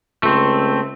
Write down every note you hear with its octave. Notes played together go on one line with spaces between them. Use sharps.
C#2 A3 C4